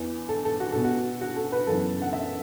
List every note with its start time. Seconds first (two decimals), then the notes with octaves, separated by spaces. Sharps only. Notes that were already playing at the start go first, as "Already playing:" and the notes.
Already playing: E2 E3 B3
0.29 A4
0.45 A4
0.60 F#4
0.72 B2 B3 A4
0.84 F#4
1.21 F#4
1.36 A4
1.52 B4
1.67 F#2 C#3 E3 B3 A4
2.02 F#5
2.13 E5